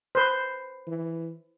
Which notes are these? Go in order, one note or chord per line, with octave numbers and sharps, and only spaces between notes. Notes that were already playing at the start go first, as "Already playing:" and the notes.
B4 C5
E3